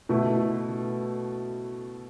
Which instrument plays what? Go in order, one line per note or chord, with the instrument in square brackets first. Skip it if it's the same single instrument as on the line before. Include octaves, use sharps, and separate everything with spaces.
[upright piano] B2 A3 E4